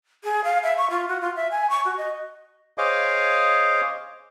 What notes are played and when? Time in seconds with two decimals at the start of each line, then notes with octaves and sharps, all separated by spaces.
0.24 G#4
0.44 F5
0.63 E5
0.77 C#6
0.90 F4
1.08 F#4
1.21 F4
1.36 E5
1.51 G#5
1.70 C#6
1.85 F#4
1.97 D#5
2.78 G#4 C5 C#5 D#5 F5 D6